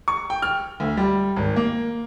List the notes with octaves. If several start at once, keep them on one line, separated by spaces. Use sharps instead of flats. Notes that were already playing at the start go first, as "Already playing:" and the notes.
C#6
G5
F6
D2
G3
G#1
A#3